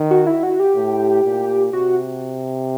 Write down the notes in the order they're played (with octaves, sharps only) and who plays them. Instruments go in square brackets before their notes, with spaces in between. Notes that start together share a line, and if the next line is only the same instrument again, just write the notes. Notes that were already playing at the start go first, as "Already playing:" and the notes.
Already playing: [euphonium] D#3
[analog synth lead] F#4
E4
F#4
G4
[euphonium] A2
A#2
[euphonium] C3 [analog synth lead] F#4